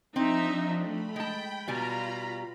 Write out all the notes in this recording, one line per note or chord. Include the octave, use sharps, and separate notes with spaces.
F3 C4 D4 D#4 E5
A3 B5
G#3 G5 A5
B2 G3 F4 G#5 A#5